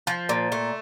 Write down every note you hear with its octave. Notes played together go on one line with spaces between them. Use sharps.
F3
A#2
A3